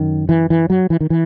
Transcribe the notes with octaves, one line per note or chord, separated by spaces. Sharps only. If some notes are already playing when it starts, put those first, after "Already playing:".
Already playing: F#2 D#3
E3
E3
F#3
E3
D#3
E3